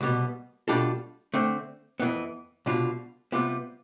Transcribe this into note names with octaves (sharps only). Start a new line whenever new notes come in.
C2 B2 G3 B3
B2 G3 D4 F4 A4
D3 A3 C4
F2 E3 B3
C2 B2 G3 D4 F4
C3 G3 B3 F4